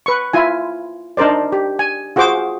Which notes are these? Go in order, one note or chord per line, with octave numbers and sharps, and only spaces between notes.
B4 C#6
E4 F4 G#5
D4 D#4 A#4 C5 D5
G4
G#5
F4 F#4 G#4 C5 D6